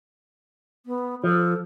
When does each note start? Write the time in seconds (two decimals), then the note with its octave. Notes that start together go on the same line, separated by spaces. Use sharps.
0.86 B3
1.24 F3 A4